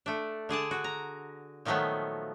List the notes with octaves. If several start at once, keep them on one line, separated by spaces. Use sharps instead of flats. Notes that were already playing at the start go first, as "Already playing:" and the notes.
A3 D4
D3 G#4 D5 A5
F#4
A#5
A#2 D#3 F3 F#3 A3 B3